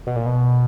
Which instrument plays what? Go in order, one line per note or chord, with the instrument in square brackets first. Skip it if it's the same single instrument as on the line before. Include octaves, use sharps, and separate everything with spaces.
[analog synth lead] B2
A#2
B2